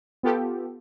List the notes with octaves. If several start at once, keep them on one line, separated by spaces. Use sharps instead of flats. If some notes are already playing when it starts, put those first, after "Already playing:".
B3 F4 G4 A4